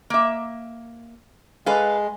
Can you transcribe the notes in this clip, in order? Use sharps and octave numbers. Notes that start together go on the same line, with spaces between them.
A#3 E5
G#3 A4 B4 F5